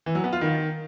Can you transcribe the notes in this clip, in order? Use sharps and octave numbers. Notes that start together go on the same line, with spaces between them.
E3
F#3
B3
F4
D#3